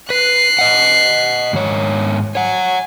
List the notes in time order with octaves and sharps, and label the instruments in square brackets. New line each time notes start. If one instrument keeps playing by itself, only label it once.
[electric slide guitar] B4 [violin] F#6 C7
[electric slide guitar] D#5 F#5
G#2 D#3 C#5
[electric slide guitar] C#5 F#5 [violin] G#5